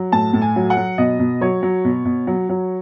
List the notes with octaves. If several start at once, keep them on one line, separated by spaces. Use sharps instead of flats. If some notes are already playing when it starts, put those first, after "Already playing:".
Already playing: F#3
A2 A5
A2
G#5
F#3
F#5
F#3
B2 D#5
B2
F#3 C#5
F#3
B2
B2
F#3
F#3